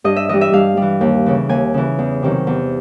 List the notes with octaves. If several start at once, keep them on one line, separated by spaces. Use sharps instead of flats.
G2 D#5
E5
E3 G3 D#5
E5
G2 F5
E3 G3
D#2
C#3 E3
D#2 G#5
C#3 E3
E2
C3 D#3 F#3
E2